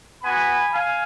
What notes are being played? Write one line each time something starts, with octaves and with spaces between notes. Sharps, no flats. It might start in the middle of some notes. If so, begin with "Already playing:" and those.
B3 F#4 G#5 B5
F5 G#5